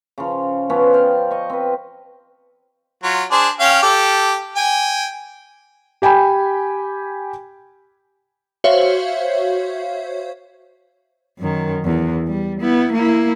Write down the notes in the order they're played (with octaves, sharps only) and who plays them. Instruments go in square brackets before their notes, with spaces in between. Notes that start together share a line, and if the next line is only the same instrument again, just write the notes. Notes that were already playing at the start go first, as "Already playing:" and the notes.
[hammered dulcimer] C#3 F3
F3 B3 C#4 D5
C5 F5 G5
D#5 C#6
C4 B4
[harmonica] F#3 F4
D4 G#4 C5
C#4 F5 G5
G4 A4
G5 G#5
[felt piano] G4 G5 G#5 B5
[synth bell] F#4 C5 C#5 E5 F5
[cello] F#2 D#3
E2
G3
B3 E4
A#3 E4